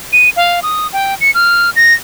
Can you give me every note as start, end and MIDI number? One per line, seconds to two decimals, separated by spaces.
0.13 0.30 99
0.36 0.60 77
0.63 0.87 87
0.93 1.15 79
1.21 1.31 97
1.34 1.70 89
1.76 1.94 94